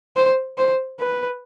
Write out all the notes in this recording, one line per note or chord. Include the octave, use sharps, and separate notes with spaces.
C5
C5
B4